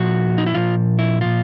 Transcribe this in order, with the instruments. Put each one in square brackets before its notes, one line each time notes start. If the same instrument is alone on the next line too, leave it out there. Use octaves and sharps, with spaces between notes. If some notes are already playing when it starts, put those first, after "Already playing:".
Already playing: [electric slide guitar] A#2 F3 F#4
D#4
E4
A#2 F3 F4
E4
A#2 F3 F4